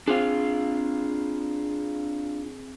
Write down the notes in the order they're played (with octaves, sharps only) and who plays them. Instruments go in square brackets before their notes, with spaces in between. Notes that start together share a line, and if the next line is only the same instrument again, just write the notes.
[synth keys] C4 G#4 [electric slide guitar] D4 F4 F5